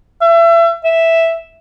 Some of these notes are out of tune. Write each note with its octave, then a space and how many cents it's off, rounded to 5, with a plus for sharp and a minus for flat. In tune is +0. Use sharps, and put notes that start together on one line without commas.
E5 +30
E5 -5